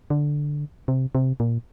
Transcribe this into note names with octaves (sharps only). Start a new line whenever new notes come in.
D3
C3
C3
A#2